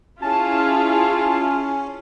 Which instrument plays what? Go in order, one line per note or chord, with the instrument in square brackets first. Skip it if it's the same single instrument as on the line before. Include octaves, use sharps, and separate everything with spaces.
[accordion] C#4 [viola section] E4 F4 G#4 [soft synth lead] A5